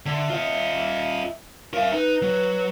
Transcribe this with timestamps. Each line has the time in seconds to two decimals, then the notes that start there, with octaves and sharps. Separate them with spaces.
0.06 D3 E5
0.30 F4 D#5
1.74 A#4 E5 F5
1.92 D#4 B4
2.22 F#3